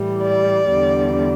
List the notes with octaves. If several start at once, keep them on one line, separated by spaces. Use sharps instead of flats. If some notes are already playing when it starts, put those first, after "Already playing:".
Already playing: A2 E3 G3
D5
E2 D3 G3